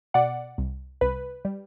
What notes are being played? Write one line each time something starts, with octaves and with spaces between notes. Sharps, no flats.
B2 D5 F#5
C2
C2 B4
G3